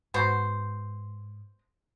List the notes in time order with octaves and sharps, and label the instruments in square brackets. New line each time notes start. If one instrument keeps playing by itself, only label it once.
[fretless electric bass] G#2 [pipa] B3 F#4 C5